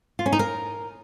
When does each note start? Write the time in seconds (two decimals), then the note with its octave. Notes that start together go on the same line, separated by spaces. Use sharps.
0.19 F4
0.26 C#4
0.33 D#4
0.39 A#4